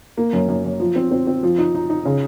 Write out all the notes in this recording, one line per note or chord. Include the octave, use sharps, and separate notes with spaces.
A#3
F#2
F#2
F#2
F3
C4
C4
C4
F3
D#4
D#4
D#4
C#3